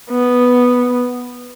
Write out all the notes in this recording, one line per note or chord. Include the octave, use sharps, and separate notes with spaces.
B3